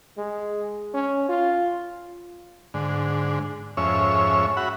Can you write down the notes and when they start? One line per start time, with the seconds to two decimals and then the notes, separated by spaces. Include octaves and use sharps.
0.17 G#3
0.94 C#4
1.29 F4
2.74 G#2 D3
3.77 F2 G#2 C#4 C#5 E5
4.57 F#4 E5 F#5 B5